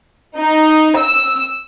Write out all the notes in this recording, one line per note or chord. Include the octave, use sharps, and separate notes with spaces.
D#4
E6